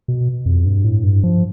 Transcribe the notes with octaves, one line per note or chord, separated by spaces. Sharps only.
B2
F2
G2
A2
G2
F3